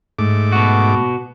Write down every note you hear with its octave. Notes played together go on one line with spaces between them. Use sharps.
G#2 A3 D6
B2 F#4